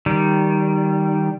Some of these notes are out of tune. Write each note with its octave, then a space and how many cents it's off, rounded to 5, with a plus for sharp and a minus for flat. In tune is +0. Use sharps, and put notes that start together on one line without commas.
D#3 +0 G3 -10